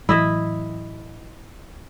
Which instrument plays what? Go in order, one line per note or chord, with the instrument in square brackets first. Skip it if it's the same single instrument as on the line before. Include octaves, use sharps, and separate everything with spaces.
[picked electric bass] A2 E3 F#3 [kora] E4 D#5 E5